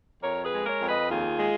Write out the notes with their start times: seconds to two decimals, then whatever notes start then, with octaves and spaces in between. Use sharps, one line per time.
0.22 F2 A#4 C#5
0.44 G#4 B4
0.52 G#3
0.66 A#4 C#5
0.80 F2
0.88 B4 D#5
1.10 D#2 F4 G#4
1.39 G#3